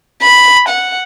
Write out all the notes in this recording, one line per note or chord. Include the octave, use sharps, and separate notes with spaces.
B5
F#5